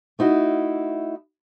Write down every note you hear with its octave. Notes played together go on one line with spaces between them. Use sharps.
A3 D#4 E4 F#4